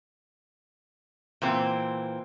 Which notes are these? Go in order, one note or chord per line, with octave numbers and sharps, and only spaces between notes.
A#2 E3 C4